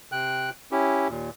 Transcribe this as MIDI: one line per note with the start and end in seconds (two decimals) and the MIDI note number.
0.12 0.50 48
0.12 0.50 79
0.12 0.50 90
0.72 1.08 61
0.72 1.08 64
0.72 1.08 67
1.09 1.30 39
1.09 1.30 46